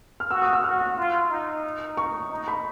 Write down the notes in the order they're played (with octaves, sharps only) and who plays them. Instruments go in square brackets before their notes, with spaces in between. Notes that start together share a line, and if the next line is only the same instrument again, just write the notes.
[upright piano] F6
[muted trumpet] F#4 [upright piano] E6
[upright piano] D#6
E6
[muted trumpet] F#4 [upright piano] F6
[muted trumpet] F4
D#4
[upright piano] C#6
[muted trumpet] D#4
[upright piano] B5